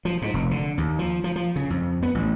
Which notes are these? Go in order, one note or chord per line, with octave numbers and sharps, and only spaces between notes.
F3
G#2
F1
D3
D#2
F3
F3
F3
C#3
F2
B3
A1